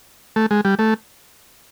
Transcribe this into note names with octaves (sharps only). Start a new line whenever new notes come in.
A3
G#3
G3
A3